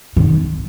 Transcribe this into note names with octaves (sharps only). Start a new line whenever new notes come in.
D#3